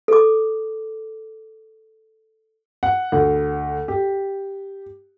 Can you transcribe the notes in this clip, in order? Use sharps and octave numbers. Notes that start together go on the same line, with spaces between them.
A4 D6
F#5
D2
G4